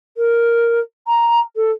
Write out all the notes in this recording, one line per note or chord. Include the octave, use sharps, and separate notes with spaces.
A#4
A#5
A4